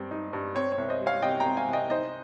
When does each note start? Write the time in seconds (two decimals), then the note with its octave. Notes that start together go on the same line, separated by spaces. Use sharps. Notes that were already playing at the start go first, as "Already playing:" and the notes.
Already playing: G2 G3 C4
0.11 D#4
0.33 G2
0.55 C4 C#5
0.72 C#5
0.78 C2
0.89 C5 D#5
1.00 G3
1.06 C#5 F5
1.22 C3 D#5 G5
1.40 G5 A#5
1.46 C4
1.57 F5 G#5
1.68 C2 D#5 G5
1.90 D#4 C5 D#5